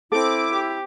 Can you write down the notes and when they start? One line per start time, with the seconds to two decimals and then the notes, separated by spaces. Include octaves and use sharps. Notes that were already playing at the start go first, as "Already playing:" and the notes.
0.12 C4 E4 A4 D6
0.53 G4